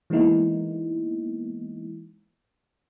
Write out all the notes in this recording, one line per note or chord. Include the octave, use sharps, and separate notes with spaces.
E3 G#3 A#3 B3 D#4 E4